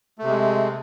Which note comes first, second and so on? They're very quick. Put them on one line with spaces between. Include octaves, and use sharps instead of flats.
A3 C3 G#3